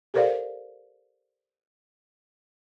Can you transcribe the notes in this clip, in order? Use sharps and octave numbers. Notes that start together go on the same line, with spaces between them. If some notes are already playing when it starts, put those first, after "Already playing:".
G4 A4 A#4 C5 D5 F5